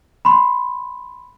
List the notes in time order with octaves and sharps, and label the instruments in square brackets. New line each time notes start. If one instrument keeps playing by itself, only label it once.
[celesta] B5 C6